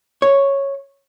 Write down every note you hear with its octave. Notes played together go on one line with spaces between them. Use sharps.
C#5